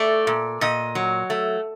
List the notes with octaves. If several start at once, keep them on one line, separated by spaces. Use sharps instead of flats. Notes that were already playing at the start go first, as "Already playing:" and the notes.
Already playing: A3 D5
A#2
A#2 D#5
F#3
A3